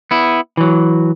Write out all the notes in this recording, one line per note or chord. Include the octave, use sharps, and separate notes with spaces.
B3 E4
E3 F#3